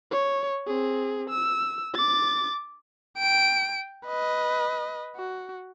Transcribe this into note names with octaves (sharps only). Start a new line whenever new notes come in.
C#5
C4 G#4
E6
D6 A6
G5 D7
B4 D#5
F#4